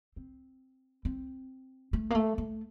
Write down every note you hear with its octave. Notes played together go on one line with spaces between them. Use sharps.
C4
C4
A3
A#3
A3
A3